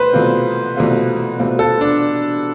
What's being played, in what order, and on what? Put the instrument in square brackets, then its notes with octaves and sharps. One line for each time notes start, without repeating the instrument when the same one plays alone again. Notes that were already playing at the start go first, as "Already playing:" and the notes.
Already playing: [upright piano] C2 A3 [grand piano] B4 C5
[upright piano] C2 B2 A3 C4 F4
C2 B2 A3 C4 F4
C2 B2 A3 C4 F4
[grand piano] A4
D4